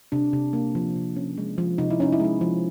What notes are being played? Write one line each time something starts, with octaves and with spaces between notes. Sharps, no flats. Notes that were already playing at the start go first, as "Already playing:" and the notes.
C3 D4
C3
A#3
F3
C3
C#4
G#3
F3
C3 D#4
E4
C#4 D#4
E4
G#3 D#4
F3